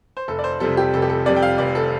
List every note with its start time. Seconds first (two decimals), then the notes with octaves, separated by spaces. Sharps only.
0.17 C5
0.28 F1 A4
0.39 D5
0.44 C5
0.60 F2 C3 G3 A4
0.77 G4
0.94 F1 A4
1.02 G4
1.09 A4
1.26 F2 C3 G3 D5
1.36 G5
1.42 F5
1.58 F1 D5
1.75 A4